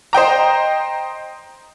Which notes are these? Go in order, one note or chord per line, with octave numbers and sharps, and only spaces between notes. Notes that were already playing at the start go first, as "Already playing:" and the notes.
C5 D#5 G5 A#5